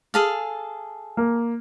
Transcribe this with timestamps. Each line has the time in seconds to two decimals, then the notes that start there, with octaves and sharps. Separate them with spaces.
0.14 G#4 A4 F5
1.17 A#3